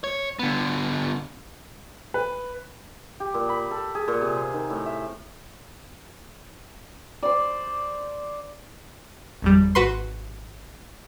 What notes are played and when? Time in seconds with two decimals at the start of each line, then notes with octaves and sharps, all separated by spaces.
0.04 C#5
0.39 D3 B3
2.14 B4
3.20 G4
3.34 A#2
3.49 B5
3.71 A4
3.95 G#4
4.08 A#2
4.21 C3
4.36 C5
4.54 D#3
4.70 A2
4.86 E5
7.23 C5 D5
9.42 G#1 F2 G3
9.75 G#1 F#4 B4 C6